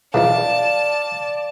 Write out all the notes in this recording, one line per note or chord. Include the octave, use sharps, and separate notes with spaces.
C#3 E3 D#4 D5 F5 A5